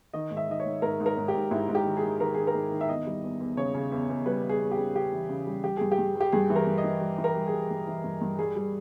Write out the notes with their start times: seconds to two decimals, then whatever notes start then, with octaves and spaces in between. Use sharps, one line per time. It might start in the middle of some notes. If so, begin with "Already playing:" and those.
0.13 D#3 D#5
0.31 G#2
0.37 E5
0.48 D#3 D#5
0.60 C#5
0.66 G#2
0.82 G#2 A#4
1.00 G#2
1.06 A#4
1.17 G#2
1.28 G4
1.34 G#2
1.51 G#2 E4
1.69 G#2
1.75 G4
1.86 D#3
1.97 G#4
2.03 D#3
2.20 D#3 A#4
2.35 D#3 G#4
2.47 A#4
2.55 G#2
2.72 D#3
2.81 E5
2.89 E2 D#5
3.07 G3
3.24 E2
3.40 E2
3.57 C#3 C#5
3.75 C#3
3.92 E2
4.09 E2
4.26 G3 B4
4.43 E2
4.49 G#4
4.61 E2
4.72 G4
4.78 C#3
4.95 C#3 G4
5.12 E3
5.29 C#3
5.47 G3
5.64 G3 G4
5.77 G2 G#4
5.92 G4
5.98 G2
6.15 G3
6.21 G4
6.32 G2 G#4
6.50 E3
6.56 A#4
6.67 G2
6.78 D#5
6.84 E3
7.01 G3
7.18 E3
7.24 A#4
7.36 G3
7.47 G#4
7.53 G3
7.70 G2
7.87 E3
8.04 G2
8.21 G2
8.39 G3 G#4
8.56 G3